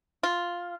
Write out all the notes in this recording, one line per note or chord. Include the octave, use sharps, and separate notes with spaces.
F4